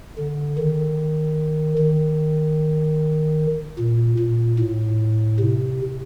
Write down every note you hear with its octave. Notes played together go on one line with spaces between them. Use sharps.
D3
D#3
D#3
A#2
A#2
A2
C3